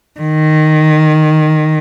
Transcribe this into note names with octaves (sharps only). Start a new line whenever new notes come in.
D#3